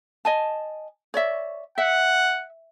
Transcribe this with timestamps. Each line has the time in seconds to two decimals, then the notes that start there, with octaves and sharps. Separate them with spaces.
0.25 D#5 G#5 A5
1.14 C#5 D5 E5
1.78 E5 F#5